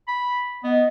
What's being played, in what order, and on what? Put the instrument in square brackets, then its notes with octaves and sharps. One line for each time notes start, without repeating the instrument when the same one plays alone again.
[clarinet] B5
[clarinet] B3 [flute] D#5